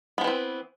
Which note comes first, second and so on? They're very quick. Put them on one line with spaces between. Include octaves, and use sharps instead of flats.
B3 F3 E3 C4